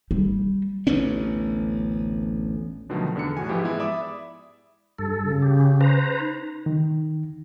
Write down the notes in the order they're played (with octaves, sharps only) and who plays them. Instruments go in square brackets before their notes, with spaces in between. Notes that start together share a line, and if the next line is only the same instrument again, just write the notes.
[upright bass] G3
[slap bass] A1 D2 B3 C#4
[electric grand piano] B2 D3 D#3 F3 F#3 A3
E2 D3 D4 C#7
A2 F#4 G#5
G#2 E3 F3 E4 G4
G#3 B3 E4
D5 E5 B5 D6 D#6
[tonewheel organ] G2 A4
[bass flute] C#3
[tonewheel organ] G4
B4 C5 A#5
[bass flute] D#4
[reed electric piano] D#3